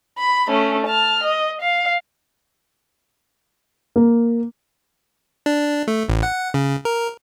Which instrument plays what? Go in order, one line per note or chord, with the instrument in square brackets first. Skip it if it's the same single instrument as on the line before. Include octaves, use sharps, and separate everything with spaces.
[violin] B5
A3 C#4
A5 F6
D#5
F5
[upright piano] A#3
[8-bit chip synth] D4
A3
A1
F#5
C#3
A#4